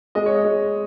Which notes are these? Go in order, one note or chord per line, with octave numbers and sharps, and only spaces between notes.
G#3 D#5
C#5
D#5
G#3